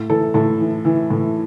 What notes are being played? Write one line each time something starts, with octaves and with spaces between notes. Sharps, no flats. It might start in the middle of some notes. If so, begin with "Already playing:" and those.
Already playing: A2
E3 A4
A2 A4
E3
E3
A2